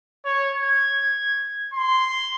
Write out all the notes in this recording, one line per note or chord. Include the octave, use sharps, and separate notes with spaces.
C#5
G#6
C6